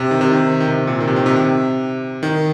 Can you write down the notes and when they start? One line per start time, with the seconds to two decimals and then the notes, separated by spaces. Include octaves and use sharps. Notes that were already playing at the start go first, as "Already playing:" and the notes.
Already playing: C3
0.11 D#3
0.21 C3
0.31 D#3
0.60 D#3
0.68 C3
0.87 A#2
1.00 D#3
1.07 C3
1.16 D#3
1.26 C3
1.36 C3
2.23 D#3